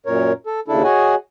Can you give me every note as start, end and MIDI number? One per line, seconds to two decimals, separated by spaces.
0.06 0.32 42
0.06 0.32 46
0.06 0.32 70
0.06 0.32 73
0.47 0.60 69
0.68 0.83 39
0.68 0.83 49
0.68 0.83 62
0.68 0.83 64
0.68 0.83 69
0.84 1.15 66
0.84 1.15 68
0.84 1.15 73
0.84 1.15 75
0.84 1.15 78
0.84 1.15 80